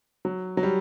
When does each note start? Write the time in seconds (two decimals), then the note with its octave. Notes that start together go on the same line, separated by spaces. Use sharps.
0.25 F#3
0.57 F#3
0.63 G3